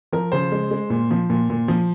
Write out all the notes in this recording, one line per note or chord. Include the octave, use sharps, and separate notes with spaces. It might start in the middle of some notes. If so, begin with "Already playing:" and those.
F3 A#4
C#3 C5
G#3
G#3
A#2
F3
A#2
A#2
F3